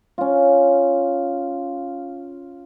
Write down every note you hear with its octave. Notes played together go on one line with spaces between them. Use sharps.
C#4 F4